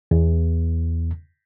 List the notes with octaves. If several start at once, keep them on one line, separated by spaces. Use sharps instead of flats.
E2